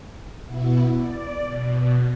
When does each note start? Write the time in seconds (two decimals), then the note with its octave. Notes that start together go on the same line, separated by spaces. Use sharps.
0.45 B2 B3 E4
0.98 D5
1.44 B2